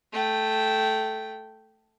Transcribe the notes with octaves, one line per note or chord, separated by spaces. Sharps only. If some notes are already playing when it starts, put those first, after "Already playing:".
A3 G5